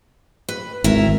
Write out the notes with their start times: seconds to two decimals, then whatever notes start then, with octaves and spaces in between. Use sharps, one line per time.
0.49 B4
0.84 G#1 E4 A#4 E5